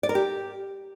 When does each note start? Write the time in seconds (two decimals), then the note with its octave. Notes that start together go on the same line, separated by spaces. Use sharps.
0.03 D5
0.09 A#4
0.15 G4